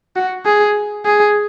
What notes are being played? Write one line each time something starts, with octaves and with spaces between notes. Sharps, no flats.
F#4
G#4
G#4